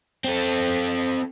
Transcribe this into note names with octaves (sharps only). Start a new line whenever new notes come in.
C4 A4